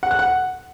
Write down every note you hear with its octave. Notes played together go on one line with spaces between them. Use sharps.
F#5
F#6
F#5